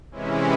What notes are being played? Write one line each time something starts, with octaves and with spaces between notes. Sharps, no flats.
C3 E3 G#3 C#4 E4